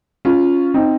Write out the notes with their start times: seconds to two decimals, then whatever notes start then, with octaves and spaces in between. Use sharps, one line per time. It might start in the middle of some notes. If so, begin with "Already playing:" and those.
0.25 C#4 F4
0.74 C4 D#4